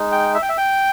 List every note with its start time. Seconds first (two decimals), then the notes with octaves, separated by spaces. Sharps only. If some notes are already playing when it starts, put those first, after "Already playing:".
Already playing: G#3 D#4
0.12 G5
0.34 E5
0.42 G5
0.49 E5
0.58 G5